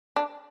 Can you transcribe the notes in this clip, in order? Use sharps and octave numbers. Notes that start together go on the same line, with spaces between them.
D4